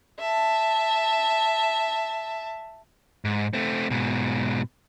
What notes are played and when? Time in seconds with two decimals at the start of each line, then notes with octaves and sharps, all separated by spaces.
0.20 E5 A5
3.25 G#2
3.53 A3 C4
3.91 G#2 B2